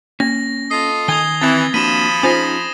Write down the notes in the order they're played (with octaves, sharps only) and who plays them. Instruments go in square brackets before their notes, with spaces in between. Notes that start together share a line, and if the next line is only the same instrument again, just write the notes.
[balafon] A#3 [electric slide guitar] C#4 [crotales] A#6
[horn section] F4 A4 D#5 [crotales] C7
[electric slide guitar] D#3 G#5 [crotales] D#6 G#6 G7
[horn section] E3 [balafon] C4 [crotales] A6
[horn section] F3 B5 [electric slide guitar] A#3 D4 F#4 [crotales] D#7 E7
[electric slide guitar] C#4 D#4 G#4 [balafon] F4 C5 G#5 [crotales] D#6 A#6